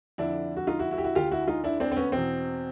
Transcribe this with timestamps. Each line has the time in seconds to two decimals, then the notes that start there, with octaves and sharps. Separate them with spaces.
0.18 F2 D3 D4 E4
0.57 F#4
0.67 D#4 F4
0.79 E4 F#4
0.91 E4 F#4
0.98 G4
1.04 E4 F#4
1.15 D2 D3 F4 G4
1.31 E4 F#4
1.47 D#4 F4
1.64 D4 E4
1.80 C4 D4
1.92 C4
1.96 B3 C#4
2.12 E2 B2 C4